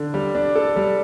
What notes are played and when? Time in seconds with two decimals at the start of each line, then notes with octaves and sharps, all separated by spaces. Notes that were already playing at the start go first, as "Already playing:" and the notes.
Already playing: D3
0.14 G3
0.35 D4
0.56 A4
0.76 G3